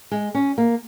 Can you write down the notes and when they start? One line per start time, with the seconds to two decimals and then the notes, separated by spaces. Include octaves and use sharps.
0.11 G#3
0.35 C#4
0.58 A#3